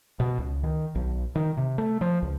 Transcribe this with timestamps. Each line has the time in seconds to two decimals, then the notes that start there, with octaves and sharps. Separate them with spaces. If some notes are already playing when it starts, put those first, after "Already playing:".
0.20 B2
0.38 C#2
0.63 D#3
0.95 B1
1.35 D#3
1.57 C3
1.78 A3
2.01 F3
2.22 C#2